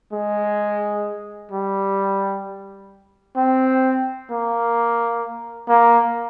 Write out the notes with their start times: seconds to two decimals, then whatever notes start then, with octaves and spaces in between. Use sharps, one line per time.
0.13 G#3
1.52 G3
3.36 C4
4.30 A#3
5.68 A#3